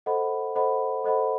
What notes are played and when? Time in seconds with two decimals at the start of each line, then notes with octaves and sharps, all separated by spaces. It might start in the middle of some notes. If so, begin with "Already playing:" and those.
0.06 A4 C5 D#5 F#5 B5
0.55 A4 C5 D#5 F#5 B5
1.04 A4 C5 D#5 F#5 B5